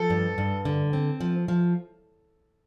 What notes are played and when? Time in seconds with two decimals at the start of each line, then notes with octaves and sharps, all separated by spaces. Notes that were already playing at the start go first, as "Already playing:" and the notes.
Already playing: F3 A4
0.10 G2
0.38 G2
0.65 D3
0.93 C4
1.21 F3
1.48 F3